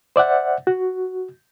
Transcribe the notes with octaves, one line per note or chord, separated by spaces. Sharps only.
C5 D5 E5 F#5
F#4